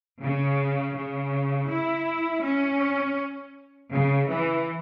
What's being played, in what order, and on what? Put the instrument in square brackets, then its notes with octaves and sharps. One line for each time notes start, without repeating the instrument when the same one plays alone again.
[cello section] C#3
C#3
E4
C#4
C#3
E3